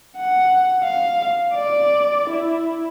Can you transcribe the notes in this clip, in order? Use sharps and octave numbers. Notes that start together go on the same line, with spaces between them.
F#5
F5
D5
E4